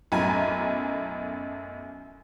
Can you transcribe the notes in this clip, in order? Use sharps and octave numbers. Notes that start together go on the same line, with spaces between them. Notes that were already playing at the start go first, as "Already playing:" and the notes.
B1 F#2 A2 G#5 A#5